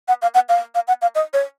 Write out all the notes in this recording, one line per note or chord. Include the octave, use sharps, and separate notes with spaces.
F#5
F5
F#5
F5
F5
F#5
F5
D#5
C#5